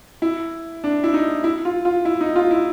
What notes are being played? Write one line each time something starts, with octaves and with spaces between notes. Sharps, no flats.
E4
D4
E4
D#4
E4
F4
F4
E4
D#4
F4
E4